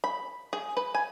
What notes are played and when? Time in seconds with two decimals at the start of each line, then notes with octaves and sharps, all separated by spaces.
0.04 B5
0.53 G#4
0.77 B4
0.95 G#5